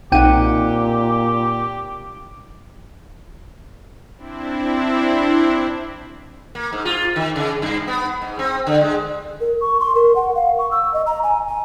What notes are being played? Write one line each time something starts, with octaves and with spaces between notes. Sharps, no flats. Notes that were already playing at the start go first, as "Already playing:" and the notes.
B1 A#2 C4 D#4 G4 F#5 G5 D#7
C4 D4 E4
A#3
G#2
F4
D#3
C#3
G2
B3
G#2
C4
D3
G#3
A#4
C#6
C6
A#4
F#5
F5
C#6
E6
D#5
A#5
G#5
G#5